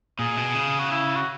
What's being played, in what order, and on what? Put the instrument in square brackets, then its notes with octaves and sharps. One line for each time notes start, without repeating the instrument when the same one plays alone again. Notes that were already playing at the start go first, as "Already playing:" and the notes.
[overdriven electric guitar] A#2 [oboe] G#4
[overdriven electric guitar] B2
C#3
[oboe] F#4
E4
F#4